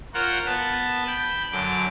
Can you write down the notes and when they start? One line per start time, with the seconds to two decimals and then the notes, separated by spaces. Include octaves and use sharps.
0.14 F4 A#4 C5 C#5 F#5
0.46 B3 B4 A5
1.07 G5 B5
1.52 F#2 D3 D6